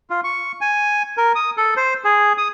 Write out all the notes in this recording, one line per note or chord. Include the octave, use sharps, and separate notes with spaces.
F4
C#6
G#5
A#4
D#6
A4
C5
G#4
D#6